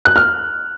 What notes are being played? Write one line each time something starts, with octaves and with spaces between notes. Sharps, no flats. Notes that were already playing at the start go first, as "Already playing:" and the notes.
F#6
F6